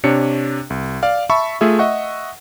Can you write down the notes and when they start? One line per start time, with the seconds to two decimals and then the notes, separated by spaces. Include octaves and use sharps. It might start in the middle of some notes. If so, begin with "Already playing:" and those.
0.04 C3 D4 C#5 C#7
0.70 C2
1.03 D5 F5
1.30 E5 A5 B5 C#6
1.61 A3 F4 G#4 E5
1.79 D#5 E5 F#5 C#6